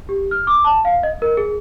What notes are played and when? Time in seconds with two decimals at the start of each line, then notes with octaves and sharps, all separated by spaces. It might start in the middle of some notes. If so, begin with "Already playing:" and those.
0.09 G4
0.31 F6
0.47 D6
0.64 A5
0.85 F5
1.03 D#5
1.22 A#4
1.37 G#4